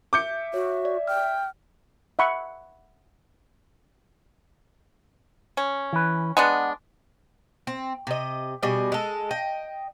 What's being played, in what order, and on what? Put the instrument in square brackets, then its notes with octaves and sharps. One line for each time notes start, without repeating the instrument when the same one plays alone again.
[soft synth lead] E5 [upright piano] D6 G6 C#7
[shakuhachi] F#4 [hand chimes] C#5
[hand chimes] D5
[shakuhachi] G5 [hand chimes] F6
[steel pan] E5 F#5 B5 C#6
[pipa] C#4
[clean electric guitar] E3 B4
[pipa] G#3 B3 D4 [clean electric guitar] F#5
[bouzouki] C4
C3 D#5
B2 G3 G#4 D#5
G#3 A4
D#5 G5